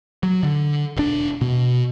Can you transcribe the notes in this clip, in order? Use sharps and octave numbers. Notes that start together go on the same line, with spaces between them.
F#3
D3
E1 D4
B2